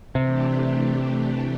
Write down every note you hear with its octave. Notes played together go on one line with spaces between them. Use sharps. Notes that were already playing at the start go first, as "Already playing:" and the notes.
C3 E3 A3 D4 G4